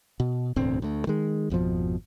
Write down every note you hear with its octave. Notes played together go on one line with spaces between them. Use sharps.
B2
E1 D2 A2 C4
D2 A3
D#3 G#3
G#1 F2 B2 F3